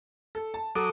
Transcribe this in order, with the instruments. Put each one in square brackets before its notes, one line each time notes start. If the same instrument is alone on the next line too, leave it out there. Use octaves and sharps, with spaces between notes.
[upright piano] A4
A5
[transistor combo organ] F#3 D6 D#6 [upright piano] A4